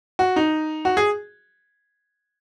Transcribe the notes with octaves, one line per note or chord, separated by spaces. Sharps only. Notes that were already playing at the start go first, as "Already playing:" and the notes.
F#4
D#4
F#4
G#4